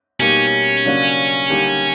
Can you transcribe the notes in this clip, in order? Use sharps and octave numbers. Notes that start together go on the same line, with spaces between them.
B2 G3 A#3 C#4 D#4 G4
C#3 F#3 A#3 D4 F#4
D3 G3 A#3 D#4 G4